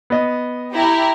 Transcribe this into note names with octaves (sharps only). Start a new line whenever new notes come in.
B3 D#5
E4 G4 A#5